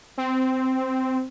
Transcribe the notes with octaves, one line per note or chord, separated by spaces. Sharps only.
C4